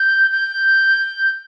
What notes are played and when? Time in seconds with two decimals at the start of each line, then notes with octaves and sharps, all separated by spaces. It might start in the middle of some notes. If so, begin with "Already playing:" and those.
Already playing: G6
0.31 G6